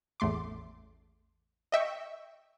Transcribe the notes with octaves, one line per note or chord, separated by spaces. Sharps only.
A1 E2 A3 C6 D6
D#5 E5 G5 C#6